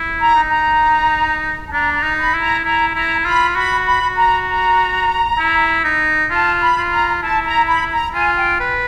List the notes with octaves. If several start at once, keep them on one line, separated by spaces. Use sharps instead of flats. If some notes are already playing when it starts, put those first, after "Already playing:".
Already playing: E4
A#5
D#4
A#5
A5
D4 A#5
A#5
D#4
B5
E4
A#5
E4 A#5
E4 A#5
F4 B5
F#4 B5
B5
F#4
A#5
A#5
E4
D#4
F4 A5
B5
F4
A#5
E4 A5
A#5
B5
A#5
F4 G#5
G5
B4